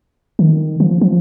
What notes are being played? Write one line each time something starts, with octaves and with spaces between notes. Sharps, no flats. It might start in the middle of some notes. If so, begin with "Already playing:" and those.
D#3
F3
F3